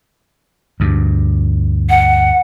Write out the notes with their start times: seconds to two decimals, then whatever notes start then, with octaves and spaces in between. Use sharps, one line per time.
0.80 D2 G2
1.90 F#5